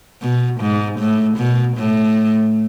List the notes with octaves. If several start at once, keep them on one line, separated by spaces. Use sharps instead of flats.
B2
G#2
A2
B2
A2